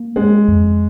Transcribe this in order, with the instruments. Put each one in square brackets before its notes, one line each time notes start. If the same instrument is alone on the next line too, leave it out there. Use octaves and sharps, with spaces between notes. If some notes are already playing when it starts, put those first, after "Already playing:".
Already playing: [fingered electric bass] A#3
[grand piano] G#3 [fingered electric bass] C#4
[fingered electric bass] F2